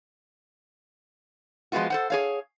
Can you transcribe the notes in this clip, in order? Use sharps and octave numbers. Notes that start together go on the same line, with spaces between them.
F3 G#3 A#3 B3 F4 F#4
A4 C5 F#5
G#4 C#5 F5